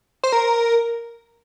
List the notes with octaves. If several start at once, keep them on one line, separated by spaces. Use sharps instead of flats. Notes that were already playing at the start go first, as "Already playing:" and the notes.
C5
A#4